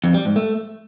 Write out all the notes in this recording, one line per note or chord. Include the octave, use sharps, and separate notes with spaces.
F2
G3
G#2
A3